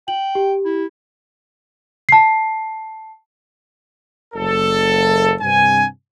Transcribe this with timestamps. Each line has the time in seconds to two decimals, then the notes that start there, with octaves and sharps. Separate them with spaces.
0.08 G5 F#7
0.35 G4
0.65 E4
2.09 A5 C7
4.34 F#1 A4
5.41 G2 C3 G#5